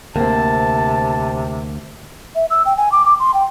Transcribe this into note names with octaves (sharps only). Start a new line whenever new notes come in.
D2 C3 A#3 C4 A5
E5
E6
G5
G#5
D6
D6
C6
G5